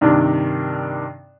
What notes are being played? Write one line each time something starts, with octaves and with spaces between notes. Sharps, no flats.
G2 C3 D#3 D4